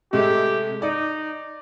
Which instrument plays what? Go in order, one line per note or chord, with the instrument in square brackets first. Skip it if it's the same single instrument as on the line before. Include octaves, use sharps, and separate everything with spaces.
[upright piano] C3 G#3 A3 [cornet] G4
[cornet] D#4 [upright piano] D5